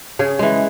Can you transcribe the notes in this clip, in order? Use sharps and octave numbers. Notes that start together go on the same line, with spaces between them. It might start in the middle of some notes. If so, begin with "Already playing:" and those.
C#3 G#4
E3 G#3